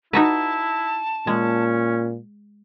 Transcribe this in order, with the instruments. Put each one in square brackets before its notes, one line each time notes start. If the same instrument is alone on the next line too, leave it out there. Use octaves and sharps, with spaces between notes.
[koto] D#4 F#4 B4 [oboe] E4 [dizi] A5
[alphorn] A#2 [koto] G#3 [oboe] C#4